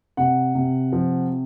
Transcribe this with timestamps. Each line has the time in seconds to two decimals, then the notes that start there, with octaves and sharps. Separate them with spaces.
0.17 C3 F#5
0.55 C3
0.92 F3